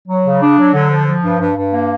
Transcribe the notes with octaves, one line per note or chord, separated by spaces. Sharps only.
F#3
C#3
D4
F#3
D3
F3
F3
G2
G2
G2
A#3